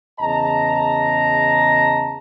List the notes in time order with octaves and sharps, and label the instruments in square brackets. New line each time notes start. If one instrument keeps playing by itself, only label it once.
[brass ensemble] E2 C#3 D#5 A5 A#5